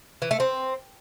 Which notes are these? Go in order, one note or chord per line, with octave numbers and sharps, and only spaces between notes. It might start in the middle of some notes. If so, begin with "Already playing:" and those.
E3
A3
C4